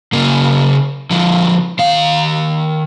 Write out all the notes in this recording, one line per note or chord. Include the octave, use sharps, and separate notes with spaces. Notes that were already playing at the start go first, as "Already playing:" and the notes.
C#3 A#3
D3 F3
D#3 F5